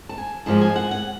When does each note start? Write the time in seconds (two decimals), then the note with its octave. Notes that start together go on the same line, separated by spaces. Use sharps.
0.09 A5
0.18 G#5
0.46 G#2 F3 G#3 A5
0.61 G#5
0.76 F#5
0.91 F#5